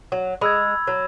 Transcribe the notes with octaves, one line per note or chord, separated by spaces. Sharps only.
F#3
G#3 B5 E6 G#6
F#3